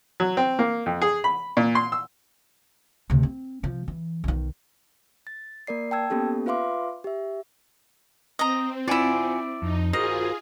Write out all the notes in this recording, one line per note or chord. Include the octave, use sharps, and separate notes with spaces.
F#3
C4
A#3
F2
G#4
B5
A#2
C6
E6
D2 C3
C4
C3 F3
E3
B1 D#3
A6
A#3 A#4 D5 C7
G5 A5 E6 G#6
A#3 B3 C#4 G4 A4
F4 B4 E5 F5 C6 D6
G4 E5
C4 D#5 A#5
E4 F4 D5 F#5 G#5
F2 D#4
F4 F#4 G#4 A#4 C5 D#5